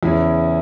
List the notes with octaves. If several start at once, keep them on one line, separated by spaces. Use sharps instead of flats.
E2 C#3 E3 E4